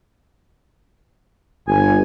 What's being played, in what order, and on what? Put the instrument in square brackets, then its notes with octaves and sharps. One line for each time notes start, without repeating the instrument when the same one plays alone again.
[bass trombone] G1 [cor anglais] G#5